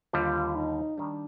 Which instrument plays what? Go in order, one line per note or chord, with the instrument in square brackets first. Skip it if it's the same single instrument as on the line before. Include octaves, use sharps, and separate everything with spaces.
[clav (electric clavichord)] D#2 D3 G3 [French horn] F4
[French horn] D#4
[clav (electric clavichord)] D#3 G3 [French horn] D4